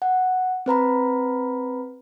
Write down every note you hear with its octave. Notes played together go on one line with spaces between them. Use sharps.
F#5
C4 B4 A#5 B5